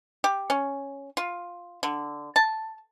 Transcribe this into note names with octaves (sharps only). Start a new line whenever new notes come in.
G4
C#4
F4
D3
A5